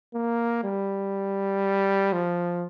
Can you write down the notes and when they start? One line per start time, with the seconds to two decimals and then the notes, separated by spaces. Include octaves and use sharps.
0.14 A#3
0.64 G3
2.13 F3